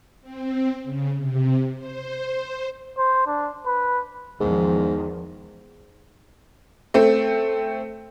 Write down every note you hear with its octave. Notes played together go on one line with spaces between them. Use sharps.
C4
C#3
C3
C5
C5
D4
B4
E2 G#2 D#3 F3
A3 C4